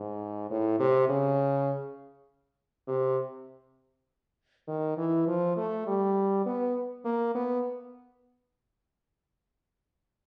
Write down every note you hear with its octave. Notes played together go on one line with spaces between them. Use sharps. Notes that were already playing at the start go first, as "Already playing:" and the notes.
Already playing: G#2
A2
C3
C#3
C3
D#3
E3
F3
A3
G3
B3
A#3
B3